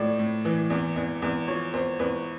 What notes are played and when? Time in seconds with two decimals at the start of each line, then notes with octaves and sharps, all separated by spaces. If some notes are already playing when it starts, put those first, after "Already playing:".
Already playing: A2 F3 D5
0.19 A2
0.45 E3
0.70 E2
0.96 E2
1.22 E2
1.48 F3 C#5
1.73 E2 C5
1.99 E2 B4